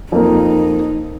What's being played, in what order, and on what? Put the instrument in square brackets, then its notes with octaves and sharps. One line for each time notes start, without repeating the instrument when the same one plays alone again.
[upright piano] F2 A#3 [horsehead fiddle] D#4